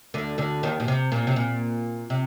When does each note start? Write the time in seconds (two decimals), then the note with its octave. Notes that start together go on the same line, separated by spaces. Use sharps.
0.14 D2 D3
0.38 D2 D3
0.63 D#2 D#3
0.80 A#2
0.88 C3
1.12 A#2
1.27 C3
1.36 A#2
2.10 C3